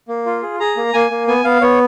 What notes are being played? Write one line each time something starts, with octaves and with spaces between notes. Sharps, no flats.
A#3
F4
G#4
G#4 A#5
A#3
A#3 G#5
A#3
B3 G#5
B3 F5
B3 C#5